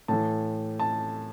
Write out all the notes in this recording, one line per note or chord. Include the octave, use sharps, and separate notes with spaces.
A2 E3 A5
A5